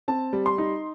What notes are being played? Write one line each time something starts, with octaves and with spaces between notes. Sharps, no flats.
C4 A5
G3
C6
D#4